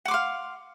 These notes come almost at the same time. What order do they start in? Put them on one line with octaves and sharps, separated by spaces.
F#5 D6 C6 F5